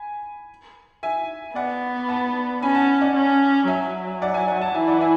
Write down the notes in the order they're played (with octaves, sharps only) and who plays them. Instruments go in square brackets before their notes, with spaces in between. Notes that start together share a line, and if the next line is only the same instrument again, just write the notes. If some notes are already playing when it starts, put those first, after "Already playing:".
Already playing: [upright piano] G#5 B5
E5 G#5
[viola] B3 [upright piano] D5 F#5
[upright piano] F#5 A5
[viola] C#4 [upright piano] G#5 B5
[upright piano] F#5 A5
D5 F#5
[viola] C#4
[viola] F#3 [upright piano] E5 G#5
[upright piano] D5 F#5
E5 G#5
D5 F#5
F#5 A5
[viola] E3 [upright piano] E5 G#5
[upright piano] D5 F#5
E5 G#5